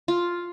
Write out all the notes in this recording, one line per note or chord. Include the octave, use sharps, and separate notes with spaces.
F4